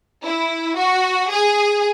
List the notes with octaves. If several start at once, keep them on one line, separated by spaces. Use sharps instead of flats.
E4
F#4
G#4